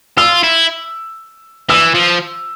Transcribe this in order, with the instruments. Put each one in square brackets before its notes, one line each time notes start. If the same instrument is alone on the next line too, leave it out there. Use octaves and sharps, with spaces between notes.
[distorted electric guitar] F4 [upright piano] E6
[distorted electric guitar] E4
[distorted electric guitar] E3 [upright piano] E6
[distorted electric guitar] F3